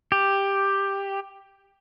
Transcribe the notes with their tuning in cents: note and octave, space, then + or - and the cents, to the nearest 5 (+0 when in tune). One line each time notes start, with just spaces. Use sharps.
G4 +10